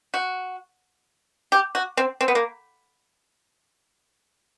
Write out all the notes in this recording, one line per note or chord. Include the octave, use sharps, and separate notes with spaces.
F#4
G4
F#4
C4
C4
B3
A#3